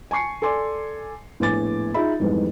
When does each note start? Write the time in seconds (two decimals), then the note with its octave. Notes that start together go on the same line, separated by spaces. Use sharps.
0.11 G#5 A5 C#6 C7 C#7
0.42 A4 D5 G#5 C6 D6
1.40 A#1 A2 B3 G#5 D6 A6
1.94 D#4 F4 G#4 E5 B5
2.20 F2 G#2 E3 G3 G#3 B3